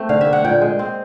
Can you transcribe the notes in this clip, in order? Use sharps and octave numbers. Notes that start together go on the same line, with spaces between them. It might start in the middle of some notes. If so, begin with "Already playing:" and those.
Already playing: A3 C4
D3 F5
E5
A#3
F#5
A#2 G5
G#3
C4